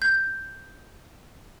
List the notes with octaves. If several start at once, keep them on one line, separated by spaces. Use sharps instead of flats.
G6